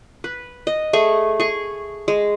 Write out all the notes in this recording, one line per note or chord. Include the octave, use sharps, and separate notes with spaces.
B4
D#5
A3 G#4 C#6
G#4 C#6
G#3